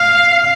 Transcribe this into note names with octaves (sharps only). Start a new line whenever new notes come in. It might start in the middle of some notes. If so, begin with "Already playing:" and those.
Already playing: F5